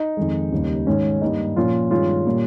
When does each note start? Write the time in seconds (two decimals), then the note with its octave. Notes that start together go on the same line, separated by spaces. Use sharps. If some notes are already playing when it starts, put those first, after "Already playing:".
Already playing: D#4
0.17 F2 D#3 G#3
0.52 D#2 C#3 G3 A#3
0.87 G#2 D#3 G#3 C#4
1.21 G2 G3 A#3 D#4
1.56 A#2 F3 A#3 C#4 F4
1.91 G2 D#3 G#3 C#4 F4
2.26 A#2 G3 A#3